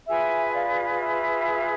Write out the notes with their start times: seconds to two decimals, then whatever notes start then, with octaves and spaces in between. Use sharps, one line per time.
0.06 F4 G#4 B4 E5 G#5
0.52 D5 F5
0.88 F5
0.99 E5